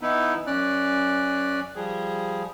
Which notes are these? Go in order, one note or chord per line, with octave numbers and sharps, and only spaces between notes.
E3 B3 D#4 E4
F#2 C#4 D5 F#6
F3 G3 G#4